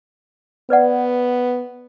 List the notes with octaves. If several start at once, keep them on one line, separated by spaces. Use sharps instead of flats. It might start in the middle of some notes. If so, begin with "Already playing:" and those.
B3 B4 D5 F#5